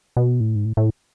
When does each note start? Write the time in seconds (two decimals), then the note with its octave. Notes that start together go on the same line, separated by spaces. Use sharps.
0.17 B2
0.40 A2
0.55 G#2
0.65 A2
0.77 A2